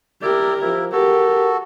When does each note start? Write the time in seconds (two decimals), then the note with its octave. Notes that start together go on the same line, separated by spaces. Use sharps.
0.22 E4 G4 A#4 D5
0.61 F3 E4
0.93 F#4 G4 A4 A#4